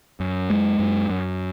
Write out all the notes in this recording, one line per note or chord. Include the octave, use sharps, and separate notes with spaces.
F#2
G#3
F#2
F#2